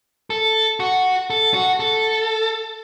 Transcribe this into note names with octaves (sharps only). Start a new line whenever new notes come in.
A4
F#4
A4
F#4
A4